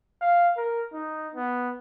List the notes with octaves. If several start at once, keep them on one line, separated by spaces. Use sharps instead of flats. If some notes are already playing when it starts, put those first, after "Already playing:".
F5
A#4
D#4
B3